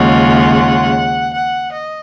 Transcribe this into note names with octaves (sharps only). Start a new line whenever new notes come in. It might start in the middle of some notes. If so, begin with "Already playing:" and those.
Already playing: D#2 C#3 G#3 C#4 F4 F#5
F#5
D#5